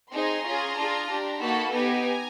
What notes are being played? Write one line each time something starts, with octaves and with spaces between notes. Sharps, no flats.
C4 D#4 G#4 A#5 C6
C#4 F4 G#4
D4 F4 G#4
D4 G4
A#3 D#4 F#4 A4 A5 B5
B3 D#4 G4 G#5 A#5